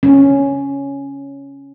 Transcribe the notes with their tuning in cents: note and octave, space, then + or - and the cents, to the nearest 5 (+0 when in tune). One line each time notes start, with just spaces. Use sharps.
C#4 +0